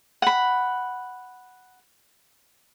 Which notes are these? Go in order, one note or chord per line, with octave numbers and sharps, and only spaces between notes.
F#5 B5